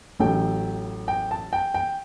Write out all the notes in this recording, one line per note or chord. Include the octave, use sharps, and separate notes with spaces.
A1 A2 F#3 A3 G5
G5
A5
G5
G5